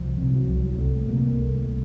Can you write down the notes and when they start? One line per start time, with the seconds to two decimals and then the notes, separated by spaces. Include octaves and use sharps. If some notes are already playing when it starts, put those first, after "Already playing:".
Already playing: C2 F3
0.18 C3
0.33 F#3
0.48 C2
0.78 C2 A3
1.08 C3 A#3
1.38 C2 A3